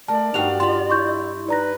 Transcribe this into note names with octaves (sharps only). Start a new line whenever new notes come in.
A3 A#4 D5 A5
G2 D#4 F#4 F5 G5 F7
F4 F#5 A5 B5 C6
E4 C6 C#6 G6
D#4 B4 D5 A#5 A#6